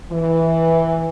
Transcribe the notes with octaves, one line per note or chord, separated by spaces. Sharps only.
E3